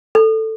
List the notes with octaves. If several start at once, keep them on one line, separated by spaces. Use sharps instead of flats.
A4